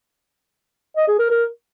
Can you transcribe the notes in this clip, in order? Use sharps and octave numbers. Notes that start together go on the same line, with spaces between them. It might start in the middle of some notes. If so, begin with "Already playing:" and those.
D#5
G#4
A#4
A#4